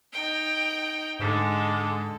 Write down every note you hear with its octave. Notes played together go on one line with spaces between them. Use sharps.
D#4 G5
G#2 D3 G#3 A4